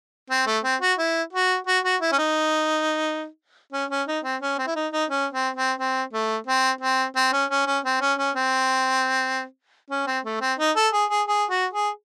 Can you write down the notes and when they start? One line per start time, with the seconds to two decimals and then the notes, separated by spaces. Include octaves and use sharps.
0.30 C4
0.47 A3
0.64 C4
0.81 F#4
0.98 E4
1.33 F#4
1.67 F#4
1.84 F#4
2.01 E4
2.12 C#4
2.18 D#4
3.73 C#4
3.90 C#4
4.07 D#4
4.24 C4
4.42 C#4
4.58 C4
4.67 E4
4.76 D#4
4.93 D#4
5.10 C#4
5.33 C4
5.56 C4
5.78 C4
6.13 A3
6.47 C4
6.81 C4
7.16 C4
7.33 C#4
7.50 C#4
7.67 C#4
7.85 C4
8.01 C#4
8.19 C#4
8.36 C4
9.90 C#4
10.07 C4
10.25 A3
10.41 C4
10.59 D#4
10.76 A4
10.93 G#4
11.10 G#4
11.28 G#4
11.50 F#4
11.73 G#4